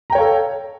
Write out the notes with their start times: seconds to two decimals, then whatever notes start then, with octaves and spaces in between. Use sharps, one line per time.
0.10 A#5
0.12 G5
0.15 C#5
0.18 F5
0.20 A4